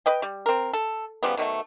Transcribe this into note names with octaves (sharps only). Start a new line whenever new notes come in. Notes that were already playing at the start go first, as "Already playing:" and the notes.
B4 D#5 G5
G3
C4 A#4
A4
C#3 F3 G3 B3
B2 D#3 F#3 A3